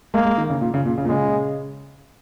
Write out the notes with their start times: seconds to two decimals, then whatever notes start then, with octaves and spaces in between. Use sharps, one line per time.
0.14 G#3 A#3
0.25 G#3
0.38 D#3
0.50 C#3
0.61 A#2
0.74 C#3
0.85 A#2
0.98 C#3
1.05 A#2
1.08 C#3 G#3